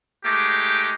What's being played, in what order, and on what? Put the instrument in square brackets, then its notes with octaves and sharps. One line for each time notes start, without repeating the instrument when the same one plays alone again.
[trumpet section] G#3 A3 D#4 G4 D6